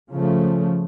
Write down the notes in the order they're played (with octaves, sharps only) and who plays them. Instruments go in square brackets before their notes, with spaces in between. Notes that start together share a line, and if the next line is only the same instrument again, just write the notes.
[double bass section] C#3 F3 A3